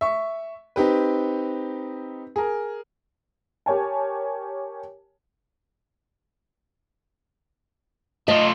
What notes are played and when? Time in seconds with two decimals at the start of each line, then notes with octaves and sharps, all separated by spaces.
0.01 E5 C#6
0.76 C4 D#4 G4 B4
2.36 G#4 A#4
3.66 G4 A#4 C#5 G#5 A5
8.28 A3 F4 D#5